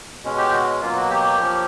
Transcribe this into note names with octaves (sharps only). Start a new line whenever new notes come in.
B2 G#3 C#4
G4
F#4
B2 F#3 A#3 F4
F#4
G4
F3 A#3 C#4